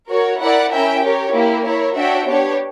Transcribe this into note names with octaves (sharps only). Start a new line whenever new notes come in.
F#4 A#4 C#5
E4 A#4 D5 F#5
C#4 E4 A#4 E5 G5
G4 A#4 C#5
A#3 E4 G4
E4 A#4 C#5
D4 F#4 C#5 E5 G5
B3 D4 G4 C#5